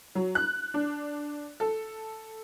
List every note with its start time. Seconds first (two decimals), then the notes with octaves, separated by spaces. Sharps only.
0.15 F#3
0.35 F#6
0.74 D4
1.60 A4